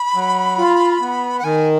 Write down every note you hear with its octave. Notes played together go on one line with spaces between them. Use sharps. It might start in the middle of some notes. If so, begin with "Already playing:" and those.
Already playing: B5
F#3
F4
B3
F#5
D#3 G#5